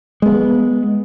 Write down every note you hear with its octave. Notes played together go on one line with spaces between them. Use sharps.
G#3 B3